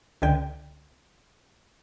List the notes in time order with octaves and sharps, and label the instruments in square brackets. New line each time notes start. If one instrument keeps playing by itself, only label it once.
[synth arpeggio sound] C#2 D3 G5